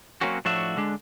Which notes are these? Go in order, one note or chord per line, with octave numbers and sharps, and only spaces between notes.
F#3 A#3 C4 C#4 F#4
A2 F3 D4 F#4 C#5 E5
D3 G#3 D4